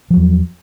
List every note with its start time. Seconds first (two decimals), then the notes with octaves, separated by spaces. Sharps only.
0.10 F3
0.13 F#3
0.16 E2